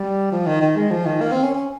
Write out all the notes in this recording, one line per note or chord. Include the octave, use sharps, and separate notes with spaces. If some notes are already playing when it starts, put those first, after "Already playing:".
Already playing: G3
F3
D#3
D#3
G#3
F3
D#3
A#3
C4
C#4
C#4